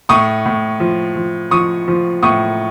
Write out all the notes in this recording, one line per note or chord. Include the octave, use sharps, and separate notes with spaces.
A2 C#6 D#6
A2
F3
F3
F3 C#6 D#6
F3
A2 C#6 D#6